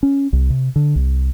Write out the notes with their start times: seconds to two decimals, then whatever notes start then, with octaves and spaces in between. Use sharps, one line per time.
0.03 C#4
0.33 C2
0.50 C3
0.76 D3
0.96 C2